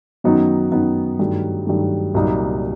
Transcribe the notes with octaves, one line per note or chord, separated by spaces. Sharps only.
F#2 D#3 F#3 B3 D#4
F#2 D#3 F#3 B3 D#4
G2 D#3 F#3 A3
G2 D#3 F#3 A3
C2 A#2 F#3 A#3 D#4